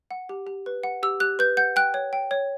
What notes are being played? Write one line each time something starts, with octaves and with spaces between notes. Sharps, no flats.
F#5
G4
G4
B4
F#5
G4 E6
G4 F#6
B4 G6
F#5 G6
G5 F#6
C#5
G5
C#5